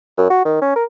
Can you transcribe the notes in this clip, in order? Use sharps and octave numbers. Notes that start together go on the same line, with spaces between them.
F#2
F#4
D#3
C#4
A#4